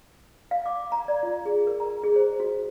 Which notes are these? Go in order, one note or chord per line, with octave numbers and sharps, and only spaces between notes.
F5
D6
A#5
D5
F4
G#4
A#4
A#5
G#4
C5
F#4